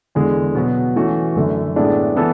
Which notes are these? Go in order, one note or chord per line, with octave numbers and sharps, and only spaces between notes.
E2 D3 G#3
B2 F#3 B3 F#4
E3 A3 C#4 F#4
F#2 D3 A3
A2 G#3 B3 D4 A4
E3 B3 E4 A4